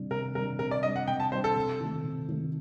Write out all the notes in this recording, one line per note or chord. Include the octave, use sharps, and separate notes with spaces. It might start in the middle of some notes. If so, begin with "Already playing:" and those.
Already playing: C3 G3 D4
C3 A#4
G3 D4 A#4
C3 A#4
D5
G3 D4 D#5
F#5
C3 G5
A5
G3 D4 C5
A4
C3
D#3 A3
C3
D#3 A3